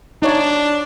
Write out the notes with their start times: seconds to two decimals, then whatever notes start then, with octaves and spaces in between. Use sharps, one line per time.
0.22 D4 D#4 C#5 F5